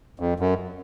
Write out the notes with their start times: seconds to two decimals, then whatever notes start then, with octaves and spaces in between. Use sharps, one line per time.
0.20 F2
0.40 F#2